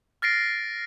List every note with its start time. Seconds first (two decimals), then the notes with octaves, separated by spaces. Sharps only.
0.22 F6 A6 A#6 C7 D7